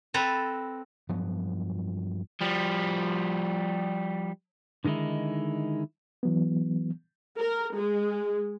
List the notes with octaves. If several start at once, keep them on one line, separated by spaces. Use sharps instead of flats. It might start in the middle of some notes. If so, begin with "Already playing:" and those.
C4 A4 B4 A#5
G2 F3 F#3 B3
F3 G3
D3 D#3 G#3 D#4 E4
E3 F#3 B3
A#4
G#3